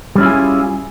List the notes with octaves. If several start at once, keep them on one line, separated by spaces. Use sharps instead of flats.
G3 C#4 E4 F4 G#4